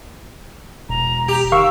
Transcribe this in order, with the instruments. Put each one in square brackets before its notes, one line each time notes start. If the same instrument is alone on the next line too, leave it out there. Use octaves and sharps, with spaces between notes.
[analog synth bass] E1 [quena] A#5
[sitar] G4 [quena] A#5
[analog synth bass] D#3 [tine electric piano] F5 C#6 [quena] E6